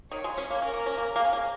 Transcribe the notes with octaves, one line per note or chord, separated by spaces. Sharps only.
D#3 C#5
G#3
G#3 C#4
A#3
C#4 A#4
A#3
C#4
A#3
A#3 G#4
C#4
A#3